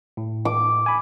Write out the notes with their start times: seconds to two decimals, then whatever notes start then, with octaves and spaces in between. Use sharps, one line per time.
0.17 A2
0.45 D6
0.86 G#5 B5